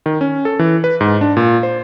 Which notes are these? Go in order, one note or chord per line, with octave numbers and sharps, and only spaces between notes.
D#3
C#4
A4
E3
B4
G#2
D4
A#2
C5